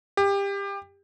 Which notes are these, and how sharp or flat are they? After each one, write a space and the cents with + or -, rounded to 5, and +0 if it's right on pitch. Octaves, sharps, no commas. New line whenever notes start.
G4 +25